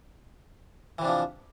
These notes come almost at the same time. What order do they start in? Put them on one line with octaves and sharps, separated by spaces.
E3 C3 D4 F3